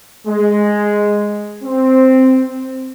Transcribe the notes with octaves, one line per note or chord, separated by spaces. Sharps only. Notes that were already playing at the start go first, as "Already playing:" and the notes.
G#3
C4